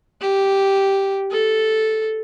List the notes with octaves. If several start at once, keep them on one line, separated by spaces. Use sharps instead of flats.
G4
A4